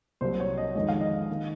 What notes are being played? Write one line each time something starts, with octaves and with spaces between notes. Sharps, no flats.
C2 C3 F#3 A#3 C5
C#5
D#5
F2 D#3 G#3 D#5
F5
D#5
D#3 A#3